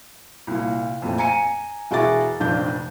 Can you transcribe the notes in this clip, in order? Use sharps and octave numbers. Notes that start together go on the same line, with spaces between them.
C2 A#2
F2 A#2 A3
G#5 A#5 C#7 D#7
E1 F#4 G#4 E5 D6 A6
F1 A#1 F2 D4 G6